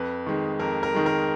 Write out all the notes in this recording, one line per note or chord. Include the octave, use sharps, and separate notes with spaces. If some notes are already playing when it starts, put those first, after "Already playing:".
Already playing: F2 B4
D#3 G#3
F2 A#4
A#4
D#3 G#3
A#4